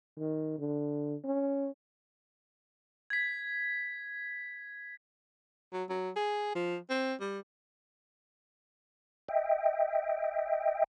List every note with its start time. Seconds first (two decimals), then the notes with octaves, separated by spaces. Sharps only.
0.18 D#3
0.59 D3
1.24 C#4
3.10 G#6 B6
5.73 F#3
5.89 F#3
6.16 G#4
6.55 F3
6.90 C4
7.20 G3
9.28 D#5 E5 G5